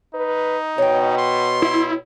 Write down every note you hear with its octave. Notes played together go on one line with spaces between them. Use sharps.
D#4 B4
B2 C#5 G5
C6
E4